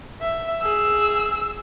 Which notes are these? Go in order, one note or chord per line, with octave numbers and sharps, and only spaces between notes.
E5
G#4 E6